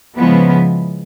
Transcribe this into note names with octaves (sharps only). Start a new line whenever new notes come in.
C#3 F3 G#3 B3 E4